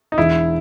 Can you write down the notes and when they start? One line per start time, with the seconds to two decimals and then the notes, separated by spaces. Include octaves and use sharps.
0.12 D#4
0.18 E1 E4